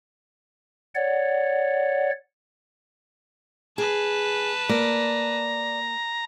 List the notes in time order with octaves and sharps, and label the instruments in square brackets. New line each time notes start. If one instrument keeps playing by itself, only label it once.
[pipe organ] C#5 D5 F#5
[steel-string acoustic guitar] G#4 [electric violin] B4 A5
[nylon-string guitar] A#3 [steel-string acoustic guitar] D5 [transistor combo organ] A#5